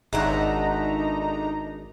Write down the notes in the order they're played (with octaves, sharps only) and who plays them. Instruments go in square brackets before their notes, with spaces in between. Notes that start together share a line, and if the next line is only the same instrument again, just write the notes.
[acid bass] G#1 [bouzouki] G#3 A3 F#5 [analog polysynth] D4 D#4 A#5